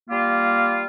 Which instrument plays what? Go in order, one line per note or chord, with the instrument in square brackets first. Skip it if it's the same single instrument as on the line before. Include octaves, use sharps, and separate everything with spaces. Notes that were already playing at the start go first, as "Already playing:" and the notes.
[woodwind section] G3 A#3 F4